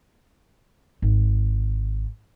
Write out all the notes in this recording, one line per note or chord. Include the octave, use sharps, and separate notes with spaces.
G#1